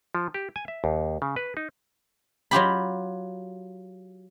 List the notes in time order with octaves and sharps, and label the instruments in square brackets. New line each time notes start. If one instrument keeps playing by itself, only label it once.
[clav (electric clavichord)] F3
G4
G#5
E5
D#2
C#3
B4
D#4
[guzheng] F#3 F4 G4 B5